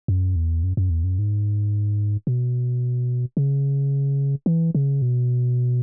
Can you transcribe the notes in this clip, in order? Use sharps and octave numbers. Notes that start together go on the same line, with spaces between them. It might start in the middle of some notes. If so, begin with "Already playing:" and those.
F#2
E2
F#2
F#2
E2
F#2
G#2
B2
C#3
E3
C#3
B2